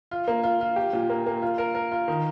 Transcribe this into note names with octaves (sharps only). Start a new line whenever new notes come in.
F4
A#3
F4
F4
G4
A#2
A#3
A#3
F4
A#4
A#4
F4
D#3